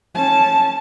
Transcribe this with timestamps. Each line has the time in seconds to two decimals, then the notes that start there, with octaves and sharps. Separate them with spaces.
0.15 C#4 A5